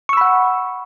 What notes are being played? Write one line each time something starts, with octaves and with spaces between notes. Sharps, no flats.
F#5 B5 C#6 E6